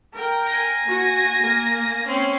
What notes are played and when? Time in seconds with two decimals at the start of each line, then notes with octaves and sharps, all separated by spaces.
0.14 A#4 G5
0.46 G#5 A#6
0.84 A#3 F#4
1.40 A#3
2.07 C4 C#4